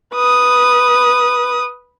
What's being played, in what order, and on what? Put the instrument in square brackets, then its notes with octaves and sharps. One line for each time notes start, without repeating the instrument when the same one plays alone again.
[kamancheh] B4 D#6